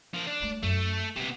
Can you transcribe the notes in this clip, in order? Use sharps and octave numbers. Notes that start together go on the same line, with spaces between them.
F3 A#4
D4
A3
F#2 A3
C3 A#3 B3